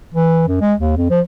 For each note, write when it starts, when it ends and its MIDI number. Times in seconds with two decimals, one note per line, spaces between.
0.14 0.45 52
0.48 0.60 42
0.61 0.74 56
0.79 0.96 39
0.97 1.08 41
1.10 1.20 53